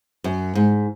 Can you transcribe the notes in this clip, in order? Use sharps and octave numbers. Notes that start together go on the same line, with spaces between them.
F#2
G#2